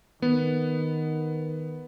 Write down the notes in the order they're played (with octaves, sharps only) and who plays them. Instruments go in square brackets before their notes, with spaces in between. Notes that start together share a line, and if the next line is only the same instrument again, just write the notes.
[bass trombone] D#3 [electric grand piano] B3